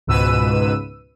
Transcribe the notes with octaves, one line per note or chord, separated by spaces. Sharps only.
C#2 G#2 B2 B4 E6 D#7